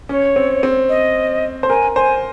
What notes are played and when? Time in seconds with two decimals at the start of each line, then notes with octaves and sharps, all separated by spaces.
0.09 C#4 C#5
0.36 C4
0.63 C4
0.89 D#5
1.63 C5
1.69 A#4 G#5
1.96 C5 G#5